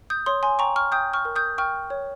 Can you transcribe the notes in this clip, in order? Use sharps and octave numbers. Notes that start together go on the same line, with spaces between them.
D#6 G6
C#5 C6 D#6
G#5 C6
G5 A#5 C#6
C#6 F6
G5 D#6 G6
C#6 F6
A#4
D#6 G6
G5 C#6 F6
C#5